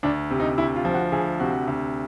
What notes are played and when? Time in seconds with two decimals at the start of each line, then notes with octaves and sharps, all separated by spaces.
0.03 D2 D4
0.31 C3
0.40 D#4
0.58 D2 E4
0.76 F4
0.85 F3
0.94 F#4
1.12 D2 G#4
1.40 C3 F#4
1.67 D2